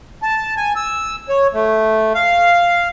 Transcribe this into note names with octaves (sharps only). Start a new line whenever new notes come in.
A5
G#5
E6
C#5
A3
F5